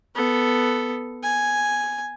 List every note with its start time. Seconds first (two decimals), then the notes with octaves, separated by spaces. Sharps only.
0.15 B3 A4
1.23 G#5